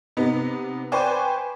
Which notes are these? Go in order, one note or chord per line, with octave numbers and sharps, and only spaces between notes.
C3 B3 D#4
B4 C5 D5 G5 G#5 C#6